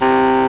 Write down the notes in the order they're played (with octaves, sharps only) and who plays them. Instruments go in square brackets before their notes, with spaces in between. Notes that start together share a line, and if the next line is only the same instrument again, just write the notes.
[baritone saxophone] C3